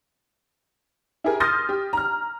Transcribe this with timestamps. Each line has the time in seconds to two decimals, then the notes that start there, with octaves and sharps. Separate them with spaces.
1.24 E4 G4 G#4 A#4
1.40 C6 D#6 F6 G6 A6 A#6
1.69 G4
1.93 A#5 F6